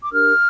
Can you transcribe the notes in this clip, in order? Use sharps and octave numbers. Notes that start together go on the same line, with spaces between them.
D6
D4 G4 A#4 F6